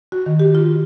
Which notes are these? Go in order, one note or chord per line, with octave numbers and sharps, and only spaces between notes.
F#4
D#3
G4
F4